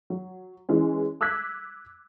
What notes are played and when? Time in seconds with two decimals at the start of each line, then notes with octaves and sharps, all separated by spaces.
0.10 F#3
0.69 E3 G#3 C#4
1.21 D6 E6 F#6 G#6 B6